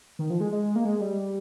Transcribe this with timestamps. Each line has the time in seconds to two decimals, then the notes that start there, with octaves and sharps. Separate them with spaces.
0.19 D#3
0.30 F3
0.41 G#3
0.52 G#3
0.76 A#3
0.85 G#3
1.01 G3